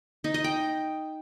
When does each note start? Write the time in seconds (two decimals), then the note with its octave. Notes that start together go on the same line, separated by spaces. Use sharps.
0.24 D#4
0.34 D#5
0.44 G5